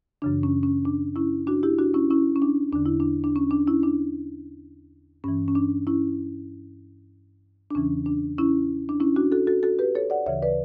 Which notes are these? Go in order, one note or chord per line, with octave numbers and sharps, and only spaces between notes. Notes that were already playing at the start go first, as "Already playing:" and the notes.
F#2 C#3 E3 D4
C#4
C#4
D4
C#4 E4
D4 F#4
E4 G4
D4 F#4
C#4 E4
C#4 E4
C#4
D4
E2 D3 D4
E4
D4
D4
C#4
D4
C#4 E4
D4
G2 E3 C#4
C#4
D4
C#4 E4
D4
E2 C#3 E3 C#4
D4
C#4 E4
D4
C#4 E4
D4 F#4
F#4 A4
F#4 A4
F#4 A4
G4 B4
A4 C#5
D5 F#5
D2 C#3 E3 C#5 E5
B4 D5